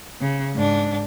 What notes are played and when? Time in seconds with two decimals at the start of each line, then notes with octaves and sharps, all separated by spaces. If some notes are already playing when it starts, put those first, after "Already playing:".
0.21 C#3
0.54 G#2 D4